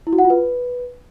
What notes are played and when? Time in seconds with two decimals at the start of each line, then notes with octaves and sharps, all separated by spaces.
0.07 E4
0.13 F#4
0.18 F#5
0.24 F4
0.30 B4